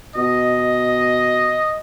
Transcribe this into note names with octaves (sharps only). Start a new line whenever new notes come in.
B2 D#5